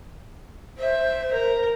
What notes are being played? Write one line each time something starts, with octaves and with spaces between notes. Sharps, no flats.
C5 E5
A#4